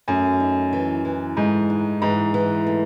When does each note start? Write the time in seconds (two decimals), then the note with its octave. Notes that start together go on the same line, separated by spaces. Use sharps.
0.08 F#2 A3
0.40 D#4
0.73 E3
1.05 E3
1.37 G#2 A3
1.70 D#4
2.02 G#2 E3
2.34 E3
2.67 A3